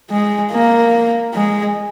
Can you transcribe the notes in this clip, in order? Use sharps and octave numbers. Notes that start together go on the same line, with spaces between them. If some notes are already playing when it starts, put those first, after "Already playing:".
G#3
A#3
G#3